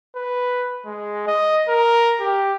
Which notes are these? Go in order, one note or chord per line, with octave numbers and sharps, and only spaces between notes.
B4
G#3
D#5
A#4
G4